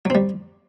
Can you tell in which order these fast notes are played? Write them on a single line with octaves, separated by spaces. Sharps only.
F#3 C4 G3